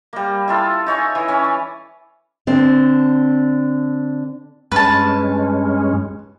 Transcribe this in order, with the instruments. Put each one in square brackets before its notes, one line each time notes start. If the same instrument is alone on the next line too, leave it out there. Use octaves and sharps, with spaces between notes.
[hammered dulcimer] G3 A#3
E4 F4 A4
D#4 C#5 E5 G#5
E3
C#4 C#5
D5
[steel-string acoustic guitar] D3 C4 D4
[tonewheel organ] G2 G#3 C#4 [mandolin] B4 A5